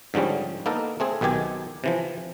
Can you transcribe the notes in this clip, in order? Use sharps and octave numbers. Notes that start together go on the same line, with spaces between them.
G#2 D3 F3 G3 C#4
A#3 B3 D#4 A4 A#4
A3 C4 G#4
B1 B2 D#3 G4 G#5
C3 E3 F3